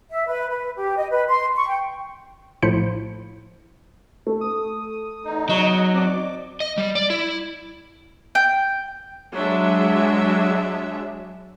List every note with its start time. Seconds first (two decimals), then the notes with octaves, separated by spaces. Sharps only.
0.10 E5
0.27 B4
0.50 B4
0.76 G4
0.97 D#5
1.11 B4
1.28 C6
1.56 C#6
1.69 G5
2.62 A#1 A2 F3 C5 B5 C#7
4.27 A3
4.41 D#6
5.25 E2 D#4
5.49 F#3 D#5
5.94 C4 D5 D6
6.60 D#5
6.78 G3
6.95 D5
7.10 E4
8.35 G5
9.34 F#3 G#3 D4 E5